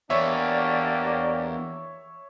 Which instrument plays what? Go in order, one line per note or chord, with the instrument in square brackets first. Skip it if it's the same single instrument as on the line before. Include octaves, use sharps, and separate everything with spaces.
[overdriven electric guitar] E2 [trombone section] A#3 D4 G4 [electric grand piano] C#5 E5 [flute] D5